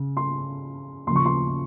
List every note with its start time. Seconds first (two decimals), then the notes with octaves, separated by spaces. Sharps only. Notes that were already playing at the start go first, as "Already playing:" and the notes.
Already playing: C#3
0.17 C6
1.06 D#2 C#3 F3 C6
1.16 C#6
1.26 C6